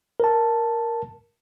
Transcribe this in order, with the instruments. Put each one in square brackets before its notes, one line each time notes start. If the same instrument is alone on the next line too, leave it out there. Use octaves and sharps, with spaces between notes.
[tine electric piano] A#4 A5